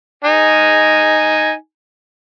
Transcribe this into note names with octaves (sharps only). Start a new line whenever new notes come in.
D#4 G#5